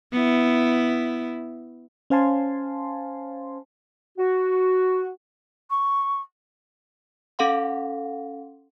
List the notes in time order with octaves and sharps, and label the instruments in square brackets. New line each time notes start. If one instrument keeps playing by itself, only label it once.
[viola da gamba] B3 E4
[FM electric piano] C#4 C5 F5 G#5 A5 C6
[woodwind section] F#4
[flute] C#6
[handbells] C#4 A4 F5 F#5 C6